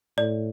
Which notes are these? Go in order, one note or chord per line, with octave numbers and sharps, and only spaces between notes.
A2 D5